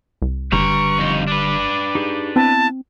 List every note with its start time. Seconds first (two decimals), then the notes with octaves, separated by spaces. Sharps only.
0.22 C2
0.52 F#1 D3 G3 B4 A#5 C#6
0.98 F2 D#4
1.27 D4 B4 D6
1.95 D#4 G4 G#4
2.36 B3 C4 E4 A5